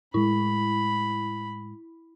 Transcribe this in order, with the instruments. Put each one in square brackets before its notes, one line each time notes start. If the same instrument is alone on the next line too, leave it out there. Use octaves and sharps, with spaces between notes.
[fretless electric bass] A2 G#3 [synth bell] E4 [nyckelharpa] B5